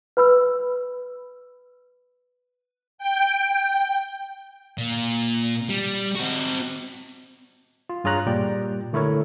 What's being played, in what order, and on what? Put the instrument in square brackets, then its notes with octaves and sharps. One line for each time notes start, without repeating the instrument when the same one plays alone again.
[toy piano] B4 B5 E6
[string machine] G5
[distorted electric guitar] A#2
G3
C4 F#4
[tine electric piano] F4
G2 F4 G#4 C#5 A#5 F#6
A#2 G3 D5 G5
D3 A3 E4 A#4 C#5